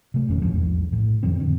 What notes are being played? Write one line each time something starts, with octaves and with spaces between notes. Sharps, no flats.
C3 A3
F#1 F2 D#3 C#4
A#1 E2 G#2 F3
A2
F2 D#3 F3 C4
D3